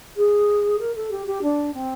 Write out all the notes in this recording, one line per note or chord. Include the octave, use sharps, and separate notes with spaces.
G#4
A#4
A4
G4
G4
D4
C4